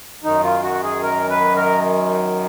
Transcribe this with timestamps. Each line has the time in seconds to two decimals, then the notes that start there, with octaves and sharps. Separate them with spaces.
0.24 F#2 D#3 D#4
0.43 F4
0.63 F#4
0.83 G#4
1.03 A#4
1.30 B4
1.56 A#4